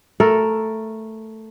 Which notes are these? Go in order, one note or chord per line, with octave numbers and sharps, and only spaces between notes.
A3 A4 A#4